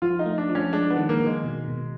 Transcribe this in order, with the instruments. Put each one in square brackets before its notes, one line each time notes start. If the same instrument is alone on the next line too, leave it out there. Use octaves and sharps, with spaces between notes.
[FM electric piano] F3 [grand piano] F4
[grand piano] D#4
[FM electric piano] A3
[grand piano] D4
[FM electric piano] F3
[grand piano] C#4
[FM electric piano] G#3 [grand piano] D4
[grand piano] B3
[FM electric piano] D#3
[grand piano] A#3
[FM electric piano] D#3
[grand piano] G#3
[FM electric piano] B2
B2